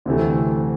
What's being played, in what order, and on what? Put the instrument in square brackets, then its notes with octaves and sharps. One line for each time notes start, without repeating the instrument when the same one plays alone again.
[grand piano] D2 C3 E3 A3